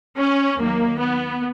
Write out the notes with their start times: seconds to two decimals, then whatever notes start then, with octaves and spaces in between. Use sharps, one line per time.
0.16 C#4
0.58 D#2 D#3 F#3 A#3
0.99 B3